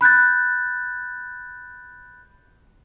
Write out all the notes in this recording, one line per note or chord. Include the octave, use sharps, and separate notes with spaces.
B5 F#6 G6 A6